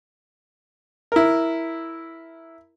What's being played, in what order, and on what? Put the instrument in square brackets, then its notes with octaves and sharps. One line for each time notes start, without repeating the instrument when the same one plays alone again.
[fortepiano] E4 A#4